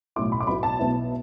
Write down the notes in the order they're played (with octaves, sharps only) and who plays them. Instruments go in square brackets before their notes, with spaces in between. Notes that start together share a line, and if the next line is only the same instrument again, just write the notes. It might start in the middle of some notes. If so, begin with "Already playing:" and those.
[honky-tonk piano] B1 A2 A3 E4 D6
B5
D6
B1 B2 B3 E4 B5
A5
B1 B2 B3 E4